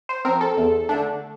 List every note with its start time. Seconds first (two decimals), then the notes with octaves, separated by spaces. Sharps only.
0.09 C5
0.25 F3 C4 A#4
0.41 A4
0.57 E2
0.89 D3 A3 D4